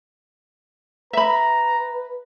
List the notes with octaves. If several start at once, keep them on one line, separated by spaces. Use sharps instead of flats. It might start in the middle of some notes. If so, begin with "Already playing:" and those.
B4 E5 A#5 B5